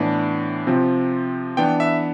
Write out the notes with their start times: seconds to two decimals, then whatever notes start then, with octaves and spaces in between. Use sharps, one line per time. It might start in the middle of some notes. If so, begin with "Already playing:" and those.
Already playing: A2 E3 B3 D4
0.67 C3 F3 C4
1.57 E3 B3 D4 G5
1.80 E5